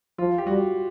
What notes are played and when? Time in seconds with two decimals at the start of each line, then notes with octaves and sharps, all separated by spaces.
0.18 F3 F4
0.38 G4
0.47 G3 F#4